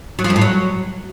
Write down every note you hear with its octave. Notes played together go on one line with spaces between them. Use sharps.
F#3
F3
F2
A2
F#3